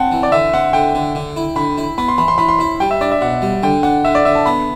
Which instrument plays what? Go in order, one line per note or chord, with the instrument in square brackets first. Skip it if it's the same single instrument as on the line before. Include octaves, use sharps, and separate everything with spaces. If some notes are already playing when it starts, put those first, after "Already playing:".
Already playing: [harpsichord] C4 [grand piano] F#5 G5 A5
[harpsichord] E3
[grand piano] D5
[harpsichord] D3 [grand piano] E5
[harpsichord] C4 [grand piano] F#5
[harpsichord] D3 [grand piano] G5
[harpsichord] D3
D3
E4
[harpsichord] D3 [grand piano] B5
[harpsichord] E4
[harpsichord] B3 [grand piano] B5
[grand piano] C6
[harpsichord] E3 [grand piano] B5
[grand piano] C6
[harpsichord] E3 [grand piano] B5
[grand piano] C6
[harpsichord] E4 [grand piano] B5
[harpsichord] G3 [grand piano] G5
[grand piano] E5
[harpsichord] D4 [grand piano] D5
[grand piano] E5
[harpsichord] B2 [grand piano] F#5
[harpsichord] G3
[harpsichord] D3 [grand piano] G5
[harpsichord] D4 [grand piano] F#5
[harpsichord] D3 [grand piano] E5
[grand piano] D5
[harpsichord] D3 [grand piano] E5
[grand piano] A5
[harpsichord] B3 [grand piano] B5